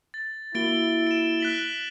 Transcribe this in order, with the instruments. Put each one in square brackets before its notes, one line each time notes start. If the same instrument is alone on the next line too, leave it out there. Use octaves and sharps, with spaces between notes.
[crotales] A6
[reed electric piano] A#3 F#4 [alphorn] E4 [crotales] A6 D7 G7
[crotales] D7 E7
F#6 B6 F#7